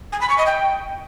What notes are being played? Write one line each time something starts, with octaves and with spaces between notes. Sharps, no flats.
G#5
B5
C#6
D#5
G5